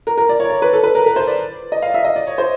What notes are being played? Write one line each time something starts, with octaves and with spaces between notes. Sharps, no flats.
A#4
A#4
D5
C#5
C#5
B4
A4
B4
A#4
A#4
C5
D5
D#5
F5
E5
D#5
D5
C#5
C5